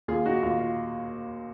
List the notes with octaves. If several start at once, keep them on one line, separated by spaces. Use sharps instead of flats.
D#2 F4 G#4
D#4 F#4
D#2 F4
F4